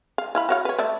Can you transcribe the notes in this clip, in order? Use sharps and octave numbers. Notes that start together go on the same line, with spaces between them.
F5
E4 F5 B5
F#4 C#5 F5
B4 C#5
A3 D5 E5